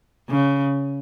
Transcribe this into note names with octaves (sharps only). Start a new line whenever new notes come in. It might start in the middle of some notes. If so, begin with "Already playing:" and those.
C#3